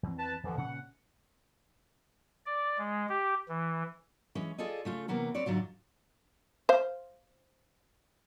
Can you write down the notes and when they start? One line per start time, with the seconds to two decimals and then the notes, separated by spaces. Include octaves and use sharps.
0.03 E2 E3 C4
0.19 B4 A5
0.43 E2 G2 D3 E3 F3
0.57 A#2 C#3 C#4 F#5
2.46 D5
2.78 G#3
3.09 G4
3.49 E3
4.35 E3 G#3 C#4
4.58 F4 G#4 A4 D5 D#5
4.85 C#3 A3 F4
5.08 C3 E3 A#3 B3 C#4
5.34 C4 B4 C#5 D5
5.46 G#2 D3 F#3 F4
6.69 C5 F5